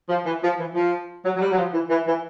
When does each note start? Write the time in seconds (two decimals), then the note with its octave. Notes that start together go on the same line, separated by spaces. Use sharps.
0.09 F3
0.25 E3
0.42 F3
0.59 E3
0.74 F3
1.24 F#3
1.35 F#3
1.41 G3
1.51 F#3
1.57 F3
1.73 E3
1.89 E3
2.06 E3